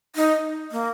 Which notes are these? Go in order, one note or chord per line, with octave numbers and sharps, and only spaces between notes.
D#4
A#3